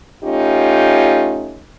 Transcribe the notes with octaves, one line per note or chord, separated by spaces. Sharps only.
A3 C#4 D#4 F4 G4